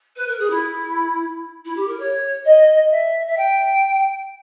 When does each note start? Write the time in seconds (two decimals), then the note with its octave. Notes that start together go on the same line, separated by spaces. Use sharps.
0.16 B4
0.27 A#4
0.39 G#4
0.50 E4
1.65 E4
1.76 G4
1.87 A#4
1.99 C#5
2.45 D#5
2.91 E5
3.27 E5
3.37 G5